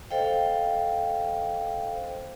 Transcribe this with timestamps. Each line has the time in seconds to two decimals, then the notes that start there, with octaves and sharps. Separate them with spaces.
0.10 A4 C5 D#5 F5 G5